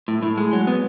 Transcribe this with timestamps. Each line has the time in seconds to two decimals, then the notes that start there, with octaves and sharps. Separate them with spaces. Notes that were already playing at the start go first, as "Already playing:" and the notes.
0.08 A2
0.23 A2
0.38 G#3
0.53 F#3
0.67 B3